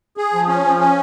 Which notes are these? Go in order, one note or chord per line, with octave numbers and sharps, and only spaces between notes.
G#4
F3
C#4
F3
C#4